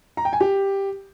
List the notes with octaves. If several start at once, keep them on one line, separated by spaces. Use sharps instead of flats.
A#5
G5
G#5
G4